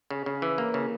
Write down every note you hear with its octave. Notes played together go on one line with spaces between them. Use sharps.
C#3
C#3
E3
A#3
C#3